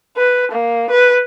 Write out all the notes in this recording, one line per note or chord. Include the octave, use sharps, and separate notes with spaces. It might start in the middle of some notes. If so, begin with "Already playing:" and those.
B4
A#3
B4